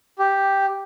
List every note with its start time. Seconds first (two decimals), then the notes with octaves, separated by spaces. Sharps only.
0.19 G4